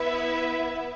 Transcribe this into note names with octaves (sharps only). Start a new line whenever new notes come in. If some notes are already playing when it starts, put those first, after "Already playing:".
Already playing: B3 E4 B4 E5